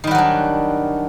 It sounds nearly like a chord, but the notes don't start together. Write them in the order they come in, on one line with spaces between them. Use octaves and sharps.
D#3 G3 F#4 F#3 D4